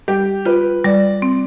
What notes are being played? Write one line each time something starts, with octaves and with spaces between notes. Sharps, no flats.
G3 G4
F4 B4
G3 D5
C4